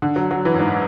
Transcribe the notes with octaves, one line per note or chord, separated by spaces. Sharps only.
D3
F#3
F#3
E3
F#2
G#2